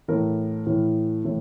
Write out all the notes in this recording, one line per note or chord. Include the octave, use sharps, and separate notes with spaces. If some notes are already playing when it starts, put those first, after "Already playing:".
A2 E3 A#4
A2 E3
A2 E3